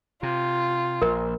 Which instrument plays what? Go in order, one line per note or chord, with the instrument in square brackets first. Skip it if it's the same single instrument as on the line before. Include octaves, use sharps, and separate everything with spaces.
[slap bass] C3 [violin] F4
[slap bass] A#1 [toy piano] A#4